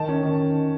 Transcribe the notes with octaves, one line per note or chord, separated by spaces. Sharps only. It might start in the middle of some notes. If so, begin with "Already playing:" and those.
Already playing: D#3 A5
C#4
D#3